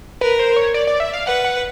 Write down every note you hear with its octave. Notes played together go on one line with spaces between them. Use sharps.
A#4 B4
C5
C#5
D5
D5
E5
F5
B4 F#5
F#5